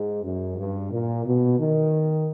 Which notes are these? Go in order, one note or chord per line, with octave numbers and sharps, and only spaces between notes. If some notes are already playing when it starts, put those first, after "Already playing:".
Already playing: G#2
F#2
G2
A#2
B2
D#3